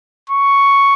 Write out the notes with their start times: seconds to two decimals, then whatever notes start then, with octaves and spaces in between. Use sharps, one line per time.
0.30 C#6